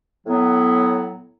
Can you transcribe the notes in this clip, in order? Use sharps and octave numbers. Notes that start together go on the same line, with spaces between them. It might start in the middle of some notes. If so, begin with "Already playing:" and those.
A2 F#3 B3